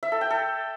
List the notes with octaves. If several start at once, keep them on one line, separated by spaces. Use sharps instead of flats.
E5
A4
G5
A4